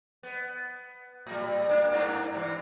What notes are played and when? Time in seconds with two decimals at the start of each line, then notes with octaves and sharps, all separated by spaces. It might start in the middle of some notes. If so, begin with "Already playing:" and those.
0.23 B3
1.27 A2 G3
1.69 A#3 D4
1.92 G2 A#3 D4
2.34 C3 E3